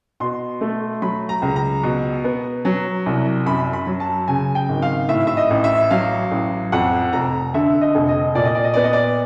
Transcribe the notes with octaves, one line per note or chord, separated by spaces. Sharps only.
B2 C6
A3
F#3 B5
A#5
C#2
A#5
B2
B3
F#3
C2
F#2 B5
B5
F#3
A5
C#3 G#5
G5
G#1
F5
A2 E5
E5
D#5
A1
E5
F#3 F5
A1
F2 F#5
F1 A#5
D3 E5
D#5
F1
D#5
A#2 D5
D#5
D5
D#5
B3 D5
D#5
D5